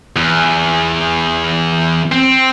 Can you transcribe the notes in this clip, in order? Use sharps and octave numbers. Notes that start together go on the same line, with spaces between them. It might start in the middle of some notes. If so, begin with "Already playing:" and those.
E2
C4